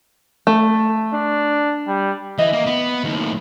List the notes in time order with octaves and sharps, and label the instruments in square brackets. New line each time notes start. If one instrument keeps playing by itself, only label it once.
[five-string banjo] A3
[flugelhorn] D4
G3
[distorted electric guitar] E3 [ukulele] D#5 E5
[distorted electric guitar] A#3
B3
D#2 A2